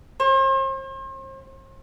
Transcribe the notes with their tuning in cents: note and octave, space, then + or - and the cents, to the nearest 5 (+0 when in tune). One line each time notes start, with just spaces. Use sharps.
C5 +40